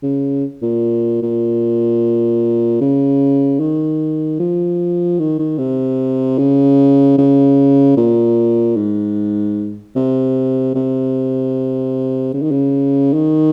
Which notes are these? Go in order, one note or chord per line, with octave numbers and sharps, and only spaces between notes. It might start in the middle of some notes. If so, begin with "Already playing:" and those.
C#3
A#2
A#2
C#3
D#3
F3
D#3
D#3
C3
C#3
C#3
A#2
G#2
C3
C3
C#3
D#3
C#3
D#3